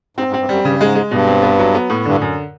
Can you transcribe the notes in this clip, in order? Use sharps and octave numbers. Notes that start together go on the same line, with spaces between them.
G#2 C4
G#2
C4
G2
F#2 G3
G2 C#3
G#2 G#3
G#3
G2 B2
C4
B3
F#3
B3
A2
G2 D3
F#2